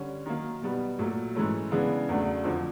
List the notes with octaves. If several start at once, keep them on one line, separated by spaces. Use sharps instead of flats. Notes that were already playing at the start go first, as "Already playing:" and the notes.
Already playing: D3 G3 C#4
D#3 F#3 A#3
B2 G3 B3
A#2 F#3 A3
G#2 E3 A3 C#4 E4
C#3 E3 G#3 B3 D4
E2 C#3 F#3 A3 D4
F2 D3 F3